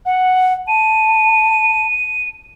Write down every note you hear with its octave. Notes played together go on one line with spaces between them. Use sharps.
F#5
A5 D#7